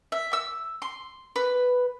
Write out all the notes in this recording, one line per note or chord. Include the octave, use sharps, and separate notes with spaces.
E5
E6
C6
B4